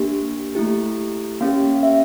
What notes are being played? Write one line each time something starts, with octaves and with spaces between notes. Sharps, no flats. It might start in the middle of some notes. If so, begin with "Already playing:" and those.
Already playing: A#3 D4 G4
A3 E4 G4
A#3 C#4 G4 F5
F5
E5